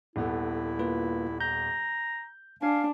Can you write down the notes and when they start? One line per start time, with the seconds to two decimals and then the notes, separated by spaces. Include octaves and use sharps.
0.16 D#1 B3 E4 A4
0.79 A#3 F4 B4
1.41 A#5 G6
2.62 D4 F5 G#5